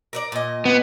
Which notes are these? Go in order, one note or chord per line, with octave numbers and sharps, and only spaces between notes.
A#4 B4 D5
A#2 D#5
B3